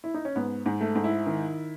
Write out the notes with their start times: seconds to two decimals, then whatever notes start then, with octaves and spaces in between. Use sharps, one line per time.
0.04 E4
0.14 D#4
0.25 C#4
0.36 G#2 B3
0.66 G#2
0.81 A3
0.95 G#2
1.04 E4
1.26 D#3